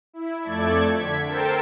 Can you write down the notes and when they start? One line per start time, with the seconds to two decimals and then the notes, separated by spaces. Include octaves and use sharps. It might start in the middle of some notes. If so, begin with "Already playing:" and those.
0.13 E4
0.42 F2 A3 A4 D5 G#6
0.94 D3 G#6 B6
1.26 A4 A#4 C5 G5 A5